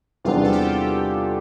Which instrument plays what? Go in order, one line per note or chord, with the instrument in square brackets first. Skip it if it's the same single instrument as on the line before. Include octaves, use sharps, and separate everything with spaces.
[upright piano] E2 C3 G3 B3 D4 [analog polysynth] F4
[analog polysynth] A4
G4